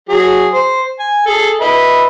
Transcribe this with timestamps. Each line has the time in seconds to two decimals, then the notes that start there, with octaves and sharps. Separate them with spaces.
0.09 F#3 G#4
0.53 C5
0.99 G#5
1.26 G#4 A4
1.61 B4 D#5 E5